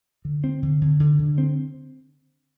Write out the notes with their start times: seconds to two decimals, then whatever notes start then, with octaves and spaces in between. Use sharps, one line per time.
0.25 D3
0.44 C4
0.63 D3
0.81 D3
1.00 D3
1.19 D3
1.38 C4